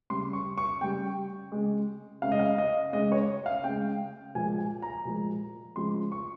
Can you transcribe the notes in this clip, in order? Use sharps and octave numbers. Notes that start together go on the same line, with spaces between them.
C#3 G3 C6
C#6
C#6
C#3 G3 G5
C#3 G#3
C#3 G#3 F5
D#5
F5
D#5
C#3 G#3 D#5
C#5
F5
C#3 G#3 G5
A#2 F3 G#3 G#5
G#5
A#5
A#2 F3 G#3
C#3 F3 G#3 C6
C#6